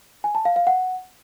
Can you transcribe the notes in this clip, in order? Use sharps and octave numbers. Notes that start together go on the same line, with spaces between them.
G#5
A5
F5
F5
F#5